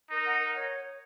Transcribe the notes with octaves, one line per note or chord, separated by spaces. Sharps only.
D#4 A#4
F#5
A#4
C#5